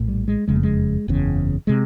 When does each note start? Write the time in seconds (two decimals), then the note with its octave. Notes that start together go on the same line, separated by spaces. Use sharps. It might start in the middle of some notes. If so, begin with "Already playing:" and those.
Already playing: A#1 A2
0.08 G3
0.28 G#3
0.48 F#1 F2 C#3 G#3
0.56 A3
0.63 G#3
1.08 F#1 E2 C#3
1.67 C3 G#3